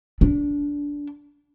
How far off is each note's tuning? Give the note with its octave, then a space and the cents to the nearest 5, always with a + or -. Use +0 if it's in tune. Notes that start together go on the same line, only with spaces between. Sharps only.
D4 -20